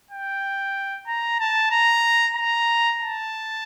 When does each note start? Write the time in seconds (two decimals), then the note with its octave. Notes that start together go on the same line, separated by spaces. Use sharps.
0.11 G5
1.07 A#5
1.39 A5
1.71 A#5
2.36 A#5
3.00 A5